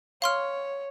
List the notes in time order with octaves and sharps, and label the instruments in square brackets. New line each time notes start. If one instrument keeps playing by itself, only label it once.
[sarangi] C#5 [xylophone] F5 C6 F6